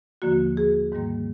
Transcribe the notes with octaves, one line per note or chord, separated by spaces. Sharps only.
D#2 D3 F3 A#3 F#4
G#4
G#2 D#3 G3 A#3